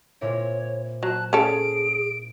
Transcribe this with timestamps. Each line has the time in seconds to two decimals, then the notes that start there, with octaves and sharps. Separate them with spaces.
0.21 A#2 C4 E4 C#5
1.03 F#3 A5 F#6
1.33 C#4 G#4 A4 D7